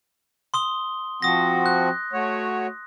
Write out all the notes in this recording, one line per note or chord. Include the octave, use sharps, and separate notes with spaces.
C6 D#6 G7
F3 C4 F#4 D#6 A#6
F#6
A3 F#4 C#5